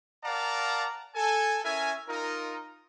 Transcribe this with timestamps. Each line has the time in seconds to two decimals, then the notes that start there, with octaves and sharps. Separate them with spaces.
0.24 A#4 D5 F5 F#5 A5 A#5
1.15 A4 G#5
1.64 C#4 E4 A#4 E5 G#5
2.08 D#4 F4 A#4